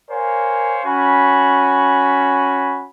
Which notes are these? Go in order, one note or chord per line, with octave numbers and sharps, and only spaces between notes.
A#4 C5 C#5 F5 G#5
C#4 F#4 G#5 B5